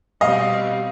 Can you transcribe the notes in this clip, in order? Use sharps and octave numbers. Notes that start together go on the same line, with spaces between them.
B2 G3 C4 D#5 F5